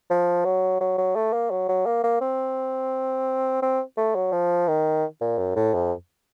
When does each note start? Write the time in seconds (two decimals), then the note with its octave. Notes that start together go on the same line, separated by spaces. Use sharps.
0.10 F3
0.45 F#3
0.80 F#3
0.98 F#3
1.16 A3
1.33 A#3
1.51 F#3
1.68 F#3
1.86 A#3
2.04 A#3
2.21 C4
3.62 C4
3.97 A3
4.15 F#3
4.32 F3
4.68 D#3
5.21 A#2
5.38 F#2
5.56 A2
5.74 F2